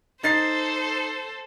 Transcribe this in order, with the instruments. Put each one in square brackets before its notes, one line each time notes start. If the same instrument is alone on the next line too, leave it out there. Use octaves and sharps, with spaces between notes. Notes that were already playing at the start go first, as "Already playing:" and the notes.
[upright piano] D#4 A6 C7 [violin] A4 C5